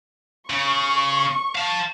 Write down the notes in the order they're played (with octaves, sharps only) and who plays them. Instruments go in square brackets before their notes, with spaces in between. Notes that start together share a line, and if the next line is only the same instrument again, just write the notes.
[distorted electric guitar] C#3 [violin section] C#6
[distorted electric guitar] F5 A5